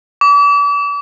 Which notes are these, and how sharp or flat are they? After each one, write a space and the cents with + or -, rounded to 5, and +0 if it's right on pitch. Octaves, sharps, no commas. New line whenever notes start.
D6 -40